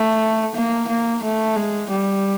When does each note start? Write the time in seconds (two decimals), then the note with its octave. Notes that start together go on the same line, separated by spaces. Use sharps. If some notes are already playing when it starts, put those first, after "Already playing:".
Already playing: A3
0.55 A#3
0.88 A#3
1.23 A3
1.56 G#3
1.90 G3